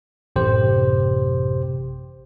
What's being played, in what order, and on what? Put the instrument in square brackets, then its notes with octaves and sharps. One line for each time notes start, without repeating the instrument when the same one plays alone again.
[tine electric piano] A1 F#2 C3 G4 C5